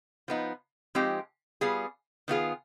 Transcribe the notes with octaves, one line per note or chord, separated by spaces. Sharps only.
F3 B3 D#4
F3 G#3 C4 D#4 G4
G3 B3 F4 G#4
D#3 B3 F4 G#4